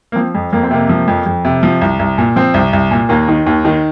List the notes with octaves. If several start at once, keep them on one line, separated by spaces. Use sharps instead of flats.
A#3
F3 C4
F2
F2 A#3
C4
C3 A#3
F3
F2
F2
C3
F3
C2
C2
A#2
F3 C4
C2
C2
A#2
D#2 A#3
D#3
D#2
D#3